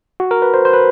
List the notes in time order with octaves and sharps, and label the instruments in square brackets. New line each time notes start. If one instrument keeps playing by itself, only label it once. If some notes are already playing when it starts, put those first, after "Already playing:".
[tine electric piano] F#4
A#4
B4
C5
C5
B4